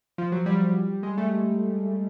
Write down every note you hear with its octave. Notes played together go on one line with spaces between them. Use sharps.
F3
F#3
G3
G#3
A3